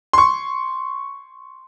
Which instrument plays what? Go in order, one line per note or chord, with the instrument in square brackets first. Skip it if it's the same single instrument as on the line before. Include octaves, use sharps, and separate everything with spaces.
[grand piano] C6 C#6